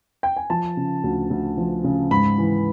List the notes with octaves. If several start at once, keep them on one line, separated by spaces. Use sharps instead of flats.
G5
G#5
F3 A5
C#3
D2
D2
F3
C#3
G#2 B5
E3